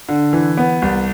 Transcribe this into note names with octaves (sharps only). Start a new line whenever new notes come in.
D3
E3
B3
C2